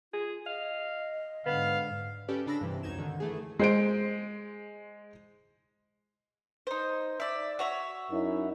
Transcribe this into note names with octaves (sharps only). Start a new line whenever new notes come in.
F4 G#4
D#5 F5
G#2 D3 B3 F5
C#4 G4 A4 B4 D5
C#3 D4 B5 E6 A#6
G2 C3 E3
C#2 F#2 D#4 G#6 E7
D3 D#3
E3 A3 G#4
G#3 C5 D7
D#4 C5
D5 E5
F#4 C#5 E5
F#2 D#4 E4